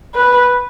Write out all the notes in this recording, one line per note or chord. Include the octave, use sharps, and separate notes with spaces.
B4